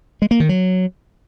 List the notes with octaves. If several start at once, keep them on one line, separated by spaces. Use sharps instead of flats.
G#3
A#3
D#3
F#3